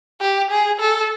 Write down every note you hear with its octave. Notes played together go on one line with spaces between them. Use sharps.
G4
G#4
A4